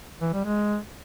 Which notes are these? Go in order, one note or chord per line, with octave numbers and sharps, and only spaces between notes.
E3
G3
G#3